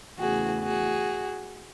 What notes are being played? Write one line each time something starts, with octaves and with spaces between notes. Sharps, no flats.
E2 C#3 E3 A3 F#4 G#4
F#4 G#4